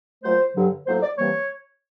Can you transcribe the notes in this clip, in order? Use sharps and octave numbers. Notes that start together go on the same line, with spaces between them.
A#2 F#3 A3 C5
G2 D3 F#3
A2 F#3 A#3 C5
D5
C3 E3 G3 A#3 C#5